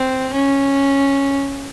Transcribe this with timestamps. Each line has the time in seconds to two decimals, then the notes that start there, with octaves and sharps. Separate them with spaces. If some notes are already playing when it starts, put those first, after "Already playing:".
Already playing: C4
0.34 C#4